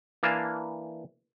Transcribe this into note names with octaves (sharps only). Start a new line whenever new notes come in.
E3 A#3 D4 F5 G#5 A5